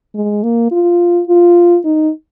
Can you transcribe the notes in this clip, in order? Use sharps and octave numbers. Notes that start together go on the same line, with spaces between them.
G#3
A#3
F4
F4
D#4